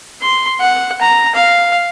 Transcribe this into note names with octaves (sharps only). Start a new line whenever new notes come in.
C6
F#5
A#5
F5